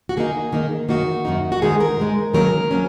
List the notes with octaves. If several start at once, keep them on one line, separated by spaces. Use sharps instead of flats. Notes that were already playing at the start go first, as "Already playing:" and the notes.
F#4
D#3 A#3 D#4 G#4
D#3 A#3 D#4
F#2 D#3 A#3 D#4 F#4
F#2 D#3 A#3 D#4
F#4
G#2 D#3 G#3 D#4 G#4
A#4
G#2 D#3 G#3 D#4
D#3 F#3 A#3 C#4 A#4
F#3 A#3 C#4